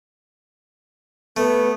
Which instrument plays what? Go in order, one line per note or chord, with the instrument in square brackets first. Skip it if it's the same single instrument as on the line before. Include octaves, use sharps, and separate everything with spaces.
[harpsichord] A3 [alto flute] B3